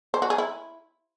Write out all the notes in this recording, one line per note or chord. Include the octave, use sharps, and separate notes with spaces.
C5
F#4
G#4
E4